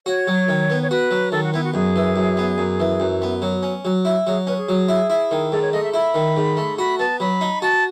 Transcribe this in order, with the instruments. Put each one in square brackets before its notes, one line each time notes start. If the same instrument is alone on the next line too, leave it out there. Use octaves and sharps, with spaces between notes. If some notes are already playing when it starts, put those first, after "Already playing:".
[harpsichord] F#4 [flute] C#5
[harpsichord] F#3
D#3
B3
[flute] C#5
[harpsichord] F#4 [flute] B4
[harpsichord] F#3
[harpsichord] D#3 [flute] A4
[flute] F#4
[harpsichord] B3 [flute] E4
[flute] F#4
[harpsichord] F#2 [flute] G#4
[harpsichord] E3
F#2
B3
F#2
E3
F#2
B3
F#3
C#4
F#3
E4
[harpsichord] F#3 [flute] G#4
[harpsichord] C#4 [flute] B4
[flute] G#4
[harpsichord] F#3
E4
E4
D#3
[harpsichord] G#2 [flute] A4
[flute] C#5
[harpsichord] A3 [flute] D#5
[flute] E5
[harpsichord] E4 [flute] B5
[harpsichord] D#3
G#2
A3
[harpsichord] F#4 [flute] B5
[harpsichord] B3 [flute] A5
[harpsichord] F#3 [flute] B5
[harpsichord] D#4
[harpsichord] F#4 [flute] A5